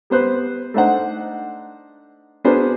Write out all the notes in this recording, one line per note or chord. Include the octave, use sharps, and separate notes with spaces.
G3 B3 C5 F#6
A3 D4 D#4 C5 F#5
B3 D4 F#4 G#4 A#4 C5